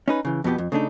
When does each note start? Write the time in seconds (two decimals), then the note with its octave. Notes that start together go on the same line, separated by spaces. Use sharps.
0.08 C#4 D#4 B4
0.25 C#3 E3
0.44 F2 B2 B3 G4
0.58 F2
0.72 C#3 A3 D4 D#4